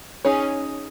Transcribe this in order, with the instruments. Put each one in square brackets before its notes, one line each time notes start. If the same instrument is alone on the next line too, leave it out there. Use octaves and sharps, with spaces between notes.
[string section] C#4 [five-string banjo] D#4 G#4 C#5